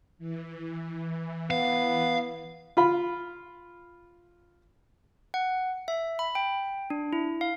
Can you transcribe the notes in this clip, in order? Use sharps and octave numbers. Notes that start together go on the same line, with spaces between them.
E3
B3 F5
F4 B5
F#5
E5
B5
G5
D4
E4
F5